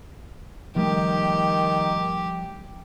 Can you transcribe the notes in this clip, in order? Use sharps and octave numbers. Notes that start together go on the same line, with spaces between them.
D#3 F3 G3 A3 G4